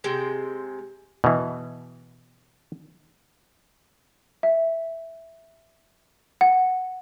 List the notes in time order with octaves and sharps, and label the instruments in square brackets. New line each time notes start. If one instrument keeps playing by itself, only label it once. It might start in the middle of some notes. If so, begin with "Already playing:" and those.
[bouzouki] C3 G#3 G5
[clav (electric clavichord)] B2 E3
[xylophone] E5
F#5